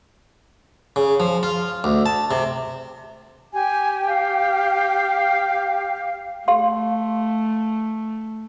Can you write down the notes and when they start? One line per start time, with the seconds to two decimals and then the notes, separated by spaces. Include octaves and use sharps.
0.96 C#3
1.20 F3
1.43 F4
1.84 D2
2.06 A5
2.31 C3
3.53 G4 G#5
4.07 F5
6.48 A3 G4 F5 C6